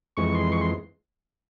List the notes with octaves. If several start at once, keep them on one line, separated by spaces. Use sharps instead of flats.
F2 E3 G#3 C#6
C6
C#6
C6